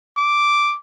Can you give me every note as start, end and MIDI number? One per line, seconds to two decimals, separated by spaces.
0.17 0.76 86